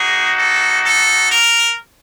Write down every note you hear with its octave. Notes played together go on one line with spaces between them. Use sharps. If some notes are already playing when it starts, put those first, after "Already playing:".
Already playing: A#3 D#4 F#4 G#4
A4
A4
A#4